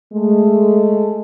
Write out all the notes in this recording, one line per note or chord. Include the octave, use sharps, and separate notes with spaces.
G#3 A3